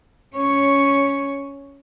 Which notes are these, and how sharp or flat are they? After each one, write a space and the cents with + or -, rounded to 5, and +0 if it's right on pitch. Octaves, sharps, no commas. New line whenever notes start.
C#4 +10 C#5 +0